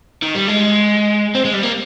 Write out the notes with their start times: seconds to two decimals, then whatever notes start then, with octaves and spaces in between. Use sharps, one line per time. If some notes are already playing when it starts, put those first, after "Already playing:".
0.23 D#3
0.35 G3
0.48 G#3
1.35 C4
1.45 G#3
1.54 G3
1.63 A#3